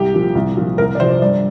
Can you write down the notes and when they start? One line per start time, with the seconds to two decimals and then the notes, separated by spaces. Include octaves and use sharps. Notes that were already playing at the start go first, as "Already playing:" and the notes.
Already playing: C2 G4
0.14 A#2 F3
0.35 C2
0.56 A#2 F3
0.78 C2 A#4
0.95 D5
1.00 C3 F3 C5
1.11 D5
1.22 G2 D5